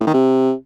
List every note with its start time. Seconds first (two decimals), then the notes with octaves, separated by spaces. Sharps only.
0.01 A2
0.07 D#3
0.14 C3